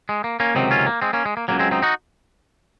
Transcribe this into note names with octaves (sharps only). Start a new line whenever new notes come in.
G#3
A#3
A#3 C#4
C#2 C3 D#3 F#3 C4 D#4
C#4 F4
A#3
G#3 C4
A#3 C#4
G#3
A#3
C#2 C#3 F#3 A#3
G#3 C4
C4 D#4
D#4 F#4